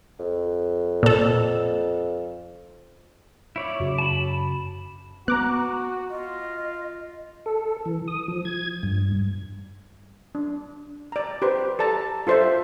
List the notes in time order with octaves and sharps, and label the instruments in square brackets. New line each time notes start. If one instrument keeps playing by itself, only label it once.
[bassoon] F2
[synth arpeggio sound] A#2 A4
[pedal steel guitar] E4 C#5 D5
[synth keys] F#2 C#3 F#4
[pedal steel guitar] A5 B5
[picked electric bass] B3 [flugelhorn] F#4 [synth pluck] A#5 D6 F#6
[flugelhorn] F4 [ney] D#5
[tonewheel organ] A4
E3
D#6
F3
G#6
G2
[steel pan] D4
D5 A#5
G4 B4 C5
A4 D5 A5 A#5
F4 A4 C5 D5 E5